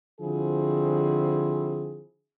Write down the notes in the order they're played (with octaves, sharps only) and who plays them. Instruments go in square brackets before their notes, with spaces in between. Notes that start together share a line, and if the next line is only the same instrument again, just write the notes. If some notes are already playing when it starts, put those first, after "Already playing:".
[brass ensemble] D3 F3 C4 E4 F#4 G#4